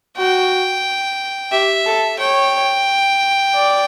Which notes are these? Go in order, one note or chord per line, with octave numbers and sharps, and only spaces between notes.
F#4 G5
G4 E5
A4
C#5 G5
D5